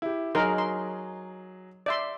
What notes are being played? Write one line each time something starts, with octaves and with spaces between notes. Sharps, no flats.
E4 G4
F#3 D#4 G#4 A#4 C6
C6
D5 E5 C6